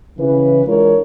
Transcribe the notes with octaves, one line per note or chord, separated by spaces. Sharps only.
C#3 E3 B4
E3 G#3 D4 F4 A#4 C#5